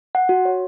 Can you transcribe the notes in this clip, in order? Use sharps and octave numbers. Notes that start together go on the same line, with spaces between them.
F#5
F#4
C#5